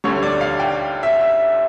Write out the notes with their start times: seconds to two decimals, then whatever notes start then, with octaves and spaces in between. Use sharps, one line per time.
0.04 D2 D3 G3 C#5
0.23 D5
0.41 F5
0.60 G5
1.03 E5